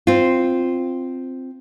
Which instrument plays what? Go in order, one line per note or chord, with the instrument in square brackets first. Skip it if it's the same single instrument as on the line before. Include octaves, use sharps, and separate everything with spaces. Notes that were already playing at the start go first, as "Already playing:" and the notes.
[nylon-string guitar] C4 F4